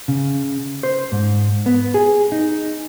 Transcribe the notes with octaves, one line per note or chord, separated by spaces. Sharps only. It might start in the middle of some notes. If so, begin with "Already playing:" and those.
C#3
C5
G#2
B3
G#4
D#4